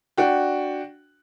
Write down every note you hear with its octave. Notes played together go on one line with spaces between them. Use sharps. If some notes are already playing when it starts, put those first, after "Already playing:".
D4 F#4 G5